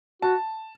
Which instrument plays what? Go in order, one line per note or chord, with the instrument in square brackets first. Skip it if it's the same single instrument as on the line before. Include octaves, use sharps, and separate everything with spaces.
[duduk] F#4 [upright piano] A5